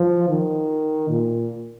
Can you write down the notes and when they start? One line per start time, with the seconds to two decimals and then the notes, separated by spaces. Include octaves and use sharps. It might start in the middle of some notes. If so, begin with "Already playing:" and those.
Already playing: F3
0.29 D#3
1.09 A#2